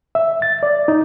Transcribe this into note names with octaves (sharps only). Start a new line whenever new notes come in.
E5
A6
D5
D#4